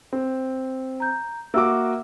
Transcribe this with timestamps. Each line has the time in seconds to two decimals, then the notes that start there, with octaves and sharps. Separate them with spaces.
0.13 C4
1.00 A#5 G6
1.54 A#3 F#4 E5 D6 E6